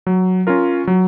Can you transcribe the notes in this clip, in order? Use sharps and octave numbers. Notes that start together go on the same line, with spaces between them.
F#3
C#4 F4 A#4
F#3